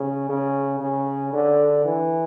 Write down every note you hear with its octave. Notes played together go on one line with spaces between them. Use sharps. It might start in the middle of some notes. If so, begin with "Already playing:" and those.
Already playing: C#3
C#3
C#3
D3
E3